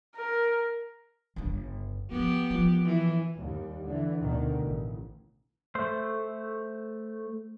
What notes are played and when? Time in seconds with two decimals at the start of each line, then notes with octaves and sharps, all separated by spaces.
0.16 A#4
1.36 G1 C#3
2.12 F3 B3 G4
2.50 F3
2.85 E3
3.36 D#2 G3
3.85 D3 E3
4.20 D2 B2 D3 D#3
4.56 A1
5.75 A3 C5 C6